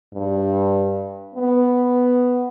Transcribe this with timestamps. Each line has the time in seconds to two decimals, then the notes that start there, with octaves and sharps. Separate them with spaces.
0.14 G2
1.35 B3